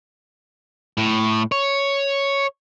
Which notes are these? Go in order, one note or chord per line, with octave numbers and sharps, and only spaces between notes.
A2
C#5